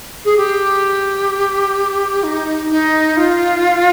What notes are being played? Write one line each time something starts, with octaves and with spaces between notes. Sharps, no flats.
G#4
G4
D#4
D#4
F4